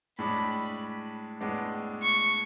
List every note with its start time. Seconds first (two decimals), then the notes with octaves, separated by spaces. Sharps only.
0.19 A2 G#3 D4 B5
1.41 A2 G#3 B3 D4
2.02 C#6